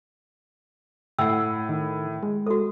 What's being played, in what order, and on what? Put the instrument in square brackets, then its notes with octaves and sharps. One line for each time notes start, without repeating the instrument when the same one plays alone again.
[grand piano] A2 [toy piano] F#5 E6
[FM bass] D#3
G#3
[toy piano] F#4 A4